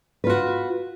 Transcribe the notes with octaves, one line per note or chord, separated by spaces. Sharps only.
F4 F#4 B4